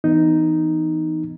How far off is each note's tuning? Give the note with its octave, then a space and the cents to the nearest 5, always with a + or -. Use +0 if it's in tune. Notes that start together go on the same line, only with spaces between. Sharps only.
E3 +0 B3 +30 D#4 +0